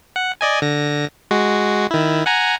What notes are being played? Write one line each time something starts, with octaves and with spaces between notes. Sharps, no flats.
F#5
D5 D#5 G#5
D3 A#6
G#3 F#4
D#3 E4
F#5 G#5 A#5